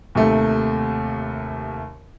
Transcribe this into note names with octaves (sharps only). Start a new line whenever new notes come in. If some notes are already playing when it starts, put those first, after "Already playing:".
D#2 C3 A3